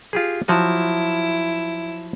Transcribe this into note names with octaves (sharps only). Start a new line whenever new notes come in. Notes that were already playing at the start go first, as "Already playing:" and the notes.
F4 G4 G#4
F3 F#3 E4 F#4